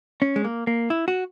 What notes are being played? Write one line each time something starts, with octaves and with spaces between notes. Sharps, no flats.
C#4
G#3
A#3
A#3
E4
F#4